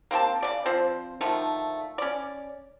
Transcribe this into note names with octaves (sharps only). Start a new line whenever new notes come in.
A#3 C4 G4 A5
C#3 D5
F3 C4 C5
D3 D#3 F3 A3
C#4 D5